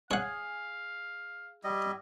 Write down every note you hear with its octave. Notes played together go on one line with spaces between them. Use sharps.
G#4 C#5 F5 F#5
G3 E4 D#5